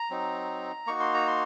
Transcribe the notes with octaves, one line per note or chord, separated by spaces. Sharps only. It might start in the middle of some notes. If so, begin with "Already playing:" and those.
Already playing: A#5
F#3 C4 D#4
A#3 D#4 F#4 C#6
C6
A#5
C6